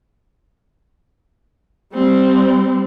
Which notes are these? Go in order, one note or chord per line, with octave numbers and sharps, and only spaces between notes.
G3 C4